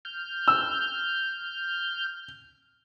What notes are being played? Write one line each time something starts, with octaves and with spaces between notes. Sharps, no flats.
F6 G6
E6